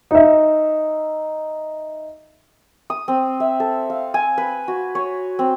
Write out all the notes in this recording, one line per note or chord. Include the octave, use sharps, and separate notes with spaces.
D#4 E5
D#6
C4
E5
A4
F5
G#5
B4
F#4
C#5
C4